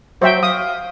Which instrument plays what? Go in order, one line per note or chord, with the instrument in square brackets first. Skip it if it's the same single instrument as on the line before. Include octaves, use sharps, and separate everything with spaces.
[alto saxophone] F#3 [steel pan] C5 E5 G5
[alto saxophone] F5 [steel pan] D#6